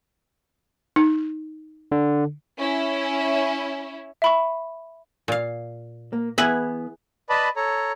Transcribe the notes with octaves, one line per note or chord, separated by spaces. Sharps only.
D#4
D3
C#4 E4
E5 B5 C#6
A#2 F5
A#3
E3 B3 E4 G#4 B4
B4 D5 D#5 A5 B5
A4 C#5 A#5